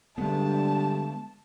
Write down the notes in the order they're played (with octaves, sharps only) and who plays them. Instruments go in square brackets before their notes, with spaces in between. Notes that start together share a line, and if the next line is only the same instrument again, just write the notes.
[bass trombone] G2 [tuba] D3 [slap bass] G#3 B3 [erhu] A5